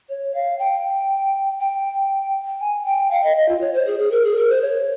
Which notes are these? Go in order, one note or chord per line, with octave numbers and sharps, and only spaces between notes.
C#5
F5
G5
G5
G#5
G5
F5
D#5
D#5
F4
C#5
C5
G#4
G#4
A#4
G#4
A#4
C5
C#5